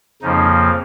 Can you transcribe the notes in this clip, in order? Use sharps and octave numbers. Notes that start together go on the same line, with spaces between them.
F2 C#3 F3 A#3 D#4